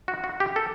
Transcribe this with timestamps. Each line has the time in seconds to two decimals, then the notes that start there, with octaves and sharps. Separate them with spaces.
0.08 F#4
0.24 F#4
0.40 G4
0.56 A4